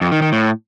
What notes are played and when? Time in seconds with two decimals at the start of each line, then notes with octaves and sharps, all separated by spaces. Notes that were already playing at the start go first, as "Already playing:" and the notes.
0.01 F2
0.12 D#3
0.22 D#3
0.32 A2